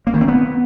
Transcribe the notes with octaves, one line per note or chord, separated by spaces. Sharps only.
A#3
D#3
C4
B3